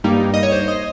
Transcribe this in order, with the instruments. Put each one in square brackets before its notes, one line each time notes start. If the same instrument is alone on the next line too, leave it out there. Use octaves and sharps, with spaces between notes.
[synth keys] G2 G3 A#3 D#4
D#5
C#5
C5
D#5